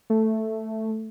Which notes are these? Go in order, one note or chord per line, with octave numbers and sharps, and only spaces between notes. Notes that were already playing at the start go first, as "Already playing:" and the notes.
A3